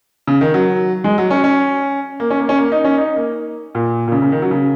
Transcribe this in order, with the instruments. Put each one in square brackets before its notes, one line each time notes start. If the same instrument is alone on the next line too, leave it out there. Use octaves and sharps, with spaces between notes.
[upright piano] C#3
D#3
F#3
G#3
F#3
C#4
C#4
A#3
C#4
A#3
C#4
A#3
D#4
C#4
D#4
A#3
A#2
A#2
C#3
C#3
D#3
F#3
C#3